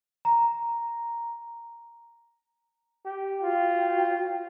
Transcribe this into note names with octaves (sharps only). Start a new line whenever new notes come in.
A#5
G4
F4 F#4 C5 G5